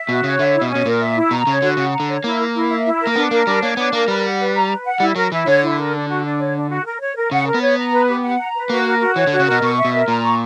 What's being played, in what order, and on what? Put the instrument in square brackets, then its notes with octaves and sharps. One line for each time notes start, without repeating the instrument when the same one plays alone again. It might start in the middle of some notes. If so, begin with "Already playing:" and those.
Already playing: [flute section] E5
[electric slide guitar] B2 [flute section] F#4
[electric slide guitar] C#3 [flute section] C#5
[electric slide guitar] D3 [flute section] E5
[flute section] E4
[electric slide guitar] B2
[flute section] C#4
[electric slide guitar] B2
[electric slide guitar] A#2 [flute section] A#4
[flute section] E5
E4
[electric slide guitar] B2 [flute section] A#5
[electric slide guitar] C#3 [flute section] C#5
[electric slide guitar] D3 [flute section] F#4
[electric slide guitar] C#3 [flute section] F#5
[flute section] A#5
[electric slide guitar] D3
[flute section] C#5
[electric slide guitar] A#3 [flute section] E4
[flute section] A#4
E4
E5
E4
A#4
[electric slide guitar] A#3
[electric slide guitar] B3 [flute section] D4
[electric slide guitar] A#3 [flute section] A#4
[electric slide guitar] G3 [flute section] D4
[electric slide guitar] A#3 [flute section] C#5
[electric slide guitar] B3 [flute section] D4
[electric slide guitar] A#3 [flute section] A#4
[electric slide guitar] G3 [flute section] B4
[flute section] F#5
B4
A#5
B4
F#5
[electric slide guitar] G3 [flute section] E4
[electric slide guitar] F#3 [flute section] A#4
[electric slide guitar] E3 [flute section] E4
[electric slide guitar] D3 [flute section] C#5
[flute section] E4
A#4
D4
F#4
D4
C#5
D4
F#4
A#4
C#5
A#4
[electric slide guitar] C#3 [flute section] F#5
[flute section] A#4
[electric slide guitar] B3
[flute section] C#5
A#5
B4
G4
F#5
A#5
B4
[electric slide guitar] A#3 [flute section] F#4
[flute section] A#4
F#4
[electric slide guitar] E3 [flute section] C#5
[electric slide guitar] D3
[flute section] F#4
[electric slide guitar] C#3
[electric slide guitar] B2 [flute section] A#4
[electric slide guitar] B2 [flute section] C#6
[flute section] E5
[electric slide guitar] B2
[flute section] A#4
[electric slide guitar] A#2 [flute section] A#5
[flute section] C#6